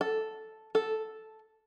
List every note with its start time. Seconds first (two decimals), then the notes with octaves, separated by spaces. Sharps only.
0.01 A4
0.75 A4